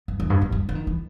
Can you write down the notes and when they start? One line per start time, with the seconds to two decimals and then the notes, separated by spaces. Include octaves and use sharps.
0.08 G2
0.20 E2
0.30 G2
0.41 E2
0.52 G2
0.69 E3
0.75 D#3
0.87 E3